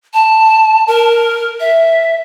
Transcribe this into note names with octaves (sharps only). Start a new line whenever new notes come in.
A5
A#4
E5